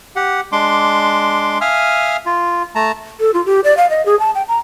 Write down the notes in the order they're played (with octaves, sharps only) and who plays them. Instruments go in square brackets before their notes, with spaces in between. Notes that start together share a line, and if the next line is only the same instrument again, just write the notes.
[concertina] G4 F#5
G#3 D4 C6 D6
E5 F5 G#5 D#6 F6
F4
A3 A5 A#5
[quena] A4
F4
G4
D5
F5
D#5
G#4
A5
G5
A#5